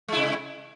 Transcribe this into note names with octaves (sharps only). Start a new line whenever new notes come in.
C3 G#3 E4